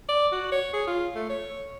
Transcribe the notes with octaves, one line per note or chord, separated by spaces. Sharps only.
D5
F#4
C#5
G#4
F4
A3
C#5